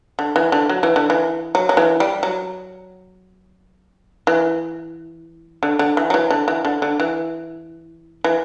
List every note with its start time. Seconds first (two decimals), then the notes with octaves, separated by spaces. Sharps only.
0.19 D3
0.36 E3
0.52 D3
0.69 F#3
0.83 E3
0.96 D3
1.10 E3
1.55 F#3
1.69 F#3
1.77 E3
2.00 G3
2.23 F#3
4.27 E3
5.63 D3
5.79 D3
5.97 E3
6.10 F#3
6.14 E3
6.30 D3
6.48 E3
6.65 D3
6.82 D3
7.00 E3
8.24 E3